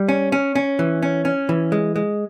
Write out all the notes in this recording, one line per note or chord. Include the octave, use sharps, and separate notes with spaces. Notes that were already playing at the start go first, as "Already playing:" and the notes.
Already playing: G3
C#4
C#4
C#4
E3
C#4
C#4
E3
G#3
G#3